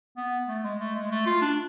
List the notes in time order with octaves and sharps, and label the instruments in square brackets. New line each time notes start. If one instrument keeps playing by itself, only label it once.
[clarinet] B3
A3
G#3
A3
G#3
A3
F4
D4